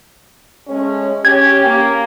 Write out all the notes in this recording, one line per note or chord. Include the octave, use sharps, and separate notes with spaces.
G#3 A3 C#4
C#4 G4 G#6
A#3